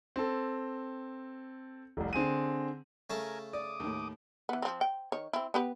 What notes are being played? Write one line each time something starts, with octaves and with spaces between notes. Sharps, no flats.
C4 A4
F1 C2
D3 C4 G#4 D#7
C#3 A3 A#4 G#5 A5
D5 D6 D#6
D#2 A2
E3 B3
F3 C4
G5
D#3 C#5
C4 E4
B3 G4 B4